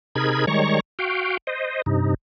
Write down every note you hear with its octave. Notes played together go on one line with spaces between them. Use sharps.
C3 D#4 G#4 A#4 B5 G#6
D#3 G3 G#3 C#5 A#5 C#6
F#4 F5 G5
C5 D#5
G2 C3 D#4